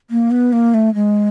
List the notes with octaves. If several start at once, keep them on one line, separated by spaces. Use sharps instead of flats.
A#3
B3
A#3
A3
G#3